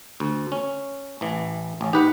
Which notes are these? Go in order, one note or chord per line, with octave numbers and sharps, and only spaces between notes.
D2
C#4
A1 E3
A1 C#4
D#4 G4 B4 F#5